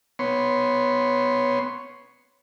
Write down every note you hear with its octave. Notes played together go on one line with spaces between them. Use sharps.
B3 C#5 C6